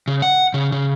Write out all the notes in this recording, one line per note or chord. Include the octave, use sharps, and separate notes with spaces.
C#3
F#5
C#3
C#3